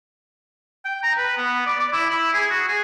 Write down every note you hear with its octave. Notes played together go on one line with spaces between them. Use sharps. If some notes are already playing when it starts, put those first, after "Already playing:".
G5
A#5
B4
B3
D5
D5
E4
E4
G#4
F#4
G#4